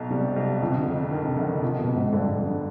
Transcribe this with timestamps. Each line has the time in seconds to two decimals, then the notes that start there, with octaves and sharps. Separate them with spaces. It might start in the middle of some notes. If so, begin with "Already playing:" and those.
Already playing: B1 B2
0.10 C3 G3
0.36 B1
0.61 F2 D3
0.69 C3
0.78 D3
0.86 F1
1.11 D3 D#3
1.25 C3
1.37 F1 D3
1.62 F2 C3
1.79 B2
1.88 F1
1.96 G#2
2.13 G2 D3
2.29 G2
2.38 F1